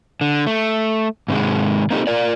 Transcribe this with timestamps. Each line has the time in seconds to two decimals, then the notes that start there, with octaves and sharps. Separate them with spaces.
0.21 D3
0.46 A3
1.28 G#2 C3 D#3 G#3
1.91 A#3 C4 D#4 E4 G4 A4
2.07 F4 A#4 D5